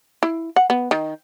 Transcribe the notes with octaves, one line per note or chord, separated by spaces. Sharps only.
E4
F#5
B3
D#3